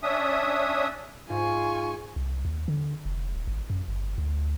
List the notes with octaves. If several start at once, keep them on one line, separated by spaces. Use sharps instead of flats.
C#4 D4 E5 D#6
G#2 F4 G#5 C#6
C2
D#2
D3
F1
D#1
G#1
F#2
G1
D2